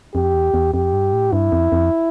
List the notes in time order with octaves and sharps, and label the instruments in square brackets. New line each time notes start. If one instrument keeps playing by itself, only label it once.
[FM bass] F2 [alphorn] G4
[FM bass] E2
E2
[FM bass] F2 [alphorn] G4
[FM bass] G2
A2
[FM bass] G2 [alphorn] E4
[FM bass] F2
F2